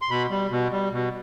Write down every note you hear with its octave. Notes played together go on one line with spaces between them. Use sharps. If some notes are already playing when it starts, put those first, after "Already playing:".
C6
B2 B5
G3
B2
G3
B2